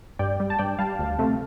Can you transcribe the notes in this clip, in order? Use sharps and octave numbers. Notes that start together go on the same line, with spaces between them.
G2 D5 G5
G3
A5
G2 D5 G5
G3 F5 A5
D2
C3 F3 A3